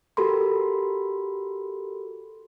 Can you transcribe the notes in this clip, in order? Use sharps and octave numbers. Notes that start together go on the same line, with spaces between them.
F#4 G4 A4 A#4 B5 C6